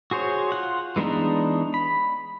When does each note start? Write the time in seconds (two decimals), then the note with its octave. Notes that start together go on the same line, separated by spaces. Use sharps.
0.11 F#4 G#4 C5 C#5
0.52 F4 F#5
0.96 E3 G#3 B3 D4 D#4
1.74 B5